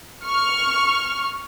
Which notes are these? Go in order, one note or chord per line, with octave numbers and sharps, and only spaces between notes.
C#6 F6